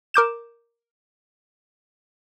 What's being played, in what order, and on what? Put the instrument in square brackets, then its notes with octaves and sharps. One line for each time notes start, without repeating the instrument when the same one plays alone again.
[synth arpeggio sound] A#4 D6 G6 E7